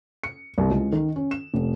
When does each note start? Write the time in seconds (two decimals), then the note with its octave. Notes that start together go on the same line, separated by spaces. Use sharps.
0.23 C#7
0.58 C2
0.70 C#2
0.92 D#3
1.16 C#4
1.31 E7
1.54 F1